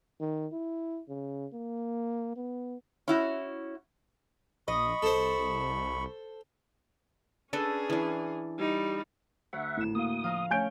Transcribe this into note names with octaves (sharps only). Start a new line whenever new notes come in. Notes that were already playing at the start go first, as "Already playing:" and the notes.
D#3
E4
C#3
A#3
B3
C#4 E4 F#4
A#1 D#5 B5 C#6
C2 A4 C5
C#4 D4 G#4 A4 B4
E3 D4
G3 D#4
D2 E5 F#5
G#1 A2 E7
A#3 F#4 F5 D#6
F3 F5 A#5
A3 C#4 G#5 G6 D7